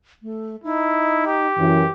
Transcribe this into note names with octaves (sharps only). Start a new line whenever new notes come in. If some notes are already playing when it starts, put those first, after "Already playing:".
A3
D#4 E4
G4
F#2 E3